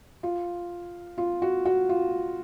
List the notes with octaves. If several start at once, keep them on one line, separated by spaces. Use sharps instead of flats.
F4
F4
F#4
F#4
F4